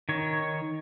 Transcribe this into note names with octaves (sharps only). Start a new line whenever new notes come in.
D#3 C#5